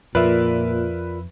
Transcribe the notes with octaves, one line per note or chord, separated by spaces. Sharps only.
F2 A#2 F3 F4 A#4 B4 D5 E5